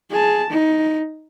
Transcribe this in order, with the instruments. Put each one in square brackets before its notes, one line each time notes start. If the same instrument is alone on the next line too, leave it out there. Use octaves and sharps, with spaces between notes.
[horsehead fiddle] G#4 A5
D#4